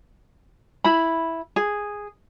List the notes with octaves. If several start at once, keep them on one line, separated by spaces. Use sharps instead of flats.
E4 B5
G#4